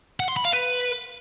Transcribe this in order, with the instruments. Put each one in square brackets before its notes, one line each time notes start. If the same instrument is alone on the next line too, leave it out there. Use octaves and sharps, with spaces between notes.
[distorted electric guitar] F#5
C6
B5
F5
B4